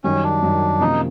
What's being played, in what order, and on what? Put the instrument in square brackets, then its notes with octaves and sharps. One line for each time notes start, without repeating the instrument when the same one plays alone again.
[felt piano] F#2 D#3 G3 [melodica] C#4
[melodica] D4
[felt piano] F#2 D#3 G3
[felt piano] C3 F3 A#3 C#4 [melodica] D#4